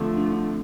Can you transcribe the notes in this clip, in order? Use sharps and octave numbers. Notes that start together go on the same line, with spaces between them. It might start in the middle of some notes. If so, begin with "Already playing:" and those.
Already playing: D3 F3 A3 C4
D4
D4